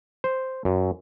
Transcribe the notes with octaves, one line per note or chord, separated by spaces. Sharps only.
C5
F#2